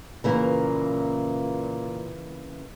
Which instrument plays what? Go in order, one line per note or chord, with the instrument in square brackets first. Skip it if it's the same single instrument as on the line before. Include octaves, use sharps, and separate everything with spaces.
[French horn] A#2 [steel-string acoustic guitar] C#3 E3 A#3